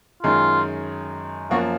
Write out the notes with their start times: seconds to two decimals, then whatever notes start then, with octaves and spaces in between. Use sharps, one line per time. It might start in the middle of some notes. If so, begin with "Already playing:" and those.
0.23 F#2 D#3 G#3 F4
1.50 F#2 F3 A#3 F#4